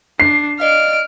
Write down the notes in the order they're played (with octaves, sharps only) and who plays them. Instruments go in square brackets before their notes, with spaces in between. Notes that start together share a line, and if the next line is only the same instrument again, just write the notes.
[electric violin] D4 [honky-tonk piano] C7
[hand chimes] D5 D#5 F5 [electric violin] F6 D7